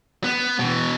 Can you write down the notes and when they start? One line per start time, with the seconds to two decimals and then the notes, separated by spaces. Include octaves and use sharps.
0.24 B3
0.59 B2 E3